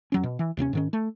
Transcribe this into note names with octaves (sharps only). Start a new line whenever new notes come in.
F2 F#3 C#4
B2
E3
D#2 C3 B3 C#4
G#2 D#3 C#4
A3